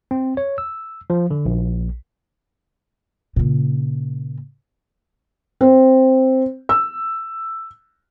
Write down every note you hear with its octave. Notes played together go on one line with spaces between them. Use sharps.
C4
C#5
E6
F3
D3
A#1
A#2 C#3
C4
E6